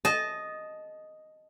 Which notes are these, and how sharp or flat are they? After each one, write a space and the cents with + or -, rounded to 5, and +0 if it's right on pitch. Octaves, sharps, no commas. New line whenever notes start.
D#5 +0 A5 -20